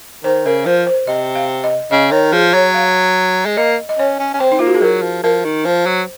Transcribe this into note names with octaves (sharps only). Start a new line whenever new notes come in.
D#3 C5
C#3 A#4
F3 C5
C5
C3 D#5
F5
D#5
C#3 D#5
D#3 C#5
F3 G#4
F#3 C#5
F5
G#3
A#3 D#5
D#5
C#4 C#5
C#4
C#4
C4 C5
D#4
A#3 F4
F#4
G#4
F#3 A#4
F3
F3 A#4
D#3
F3 C5
F#3